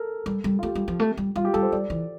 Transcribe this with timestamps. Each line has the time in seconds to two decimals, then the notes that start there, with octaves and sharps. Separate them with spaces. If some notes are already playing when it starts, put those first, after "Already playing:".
Already playing: A4 A#4
0.26 G3
0.44 G3
0.59 F4
0.63 A3 G4
0.75 G3
0.88 F3
0.99 A3
1.17 G3
1.36 G3 F4
1.45 G4
1.54 G3 A4
1.63 C5
1.72 G3 D5
1.90 E3